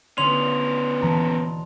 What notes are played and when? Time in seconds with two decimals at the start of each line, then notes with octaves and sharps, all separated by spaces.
0.18 D3 B3 C#4 F4 C6 F7
1.02 D#1 D#2 E3 A5 A#5